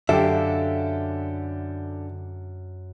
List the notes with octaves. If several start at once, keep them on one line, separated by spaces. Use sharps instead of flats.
F#2 D3 G4 A4 E5 F5 D7